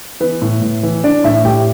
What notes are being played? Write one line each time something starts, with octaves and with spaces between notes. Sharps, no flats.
E3 B3 B4
A2
A2
E3
E3 D4 D5
A2 E4 E5
A2 G4 G5